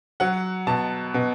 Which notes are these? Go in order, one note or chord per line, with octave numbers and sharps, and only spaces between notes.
F#3 F#5
B2 A5
B2